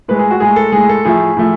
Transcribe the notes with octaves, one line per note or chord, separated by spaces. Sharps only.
A2 G#3 B4
G#4
F#4
A2 G#3 G#4
A4
A2 G#3 G#4
A4
A2 F3 A3 G#4
A2 F3 A3